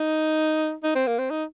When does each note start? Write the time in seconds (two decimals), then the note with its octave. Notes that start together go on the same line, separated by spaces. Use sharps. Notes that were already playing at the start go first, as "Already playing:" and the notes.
Already playing: D#4
0.83 D#4
0.95 C4
1.07 A#3
1.19 C4
1.30 D#4